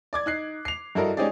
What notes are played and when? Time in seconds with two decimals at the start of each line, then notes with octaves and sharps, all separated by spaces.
0.13 D5 D6 G#6
0.26 D#4 F#6 C7
0.65 C7 F7
0.95 G2 E4 F#4 A4 A#4 D#5
1.17 G#3 C#4 D#4 G4 G#4 D5